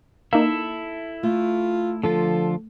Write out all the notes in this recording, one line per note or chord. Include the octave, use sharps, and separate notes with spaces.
A#3 D#4 E4 A4 E5
A3 F4
D3 F3 F4 A4